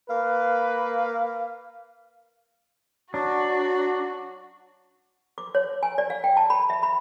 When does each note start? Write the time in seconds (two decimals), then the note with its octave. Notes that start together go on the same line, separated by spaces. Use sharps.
0.10 A#3 B4 F5
3.14 F#3 D4 F#4
5.38 D6
5.55 C#5
5.83 G#5
5.98 D5
6.10 F5
6.24 G5
6.37 A5
6.50 B5
6.70 E5
6.83 B5